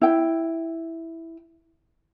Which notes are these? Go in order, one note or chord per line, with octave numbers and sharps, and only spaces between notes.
E4 G5